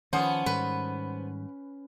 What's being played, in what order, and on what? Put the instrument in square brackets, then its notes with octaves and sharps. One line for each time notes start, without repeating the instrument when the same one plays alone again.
[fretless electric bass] D#3 F3 [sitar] B3 C5 [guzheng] C#4 [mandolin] F#5 A5 D#6
[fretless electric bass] G#2 D#3 G3 [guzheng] B4